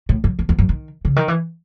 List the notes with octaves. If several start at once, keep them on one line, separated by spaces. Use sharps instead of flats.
A2
F#2
E2
E2
F#2
D#3
C#3
D#3
E3